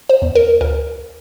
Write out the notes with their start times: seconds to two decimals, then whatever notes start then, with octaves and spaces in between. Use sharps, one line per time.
0.09 C5
0.22 E2
0.35 A#4
0.61 D2 A#4